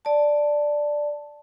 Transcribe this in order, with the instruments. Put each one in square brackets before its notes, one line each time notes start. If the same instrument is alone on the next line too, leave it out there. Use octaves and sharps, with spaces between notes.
[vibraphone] D5 A5